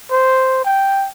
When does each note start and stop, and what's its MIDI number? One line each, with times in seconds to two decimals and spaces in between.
0.11 0.62 72
0.65 1.08 79